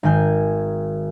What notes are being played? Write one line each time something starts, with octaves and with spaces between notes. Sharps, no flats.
G#1 D#3 G#5 G6